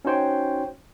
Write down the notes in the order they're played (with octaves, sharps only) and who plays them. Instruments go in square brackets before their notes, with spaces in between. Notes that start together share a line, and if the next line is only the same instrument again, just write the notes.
[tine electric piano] C#4 D#4 F#4 C5 C#5 G5